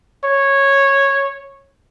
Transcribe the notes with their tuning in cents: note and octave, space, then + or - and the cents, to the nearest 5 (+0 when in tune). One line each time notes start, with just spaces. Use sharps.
C#5 -10